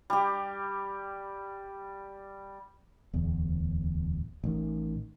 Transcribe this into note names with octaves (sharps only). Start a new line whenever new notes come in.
G3 G4
D1 E2
A1 D#3